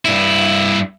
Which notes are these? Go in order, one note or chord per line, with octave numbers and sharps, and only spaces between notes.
G2 E4